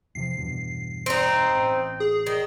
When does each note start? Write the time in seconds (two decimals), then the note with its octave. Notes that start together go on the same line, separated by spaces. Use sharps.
0.15 E2 C3 F3 C7
0.37 E2 G2 B2
1.06 C4 D#4
1.55 A1
2.00 G#4
2.27 D#3